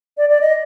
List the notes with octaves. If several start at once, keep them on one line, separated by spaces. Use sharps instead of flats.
D5
D5
D#5